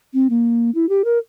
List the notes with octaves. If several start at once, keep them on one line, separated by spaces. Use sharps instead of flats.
C4
A#3
E4
G4
A#4